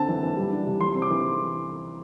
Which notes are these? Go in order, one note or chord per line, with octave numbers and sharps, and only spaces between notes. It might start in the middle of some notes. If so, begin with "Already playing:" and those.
Already playing: D3 C4 A5
E3
E3
G3
D4
C3
E3 C6
C4
D6
E3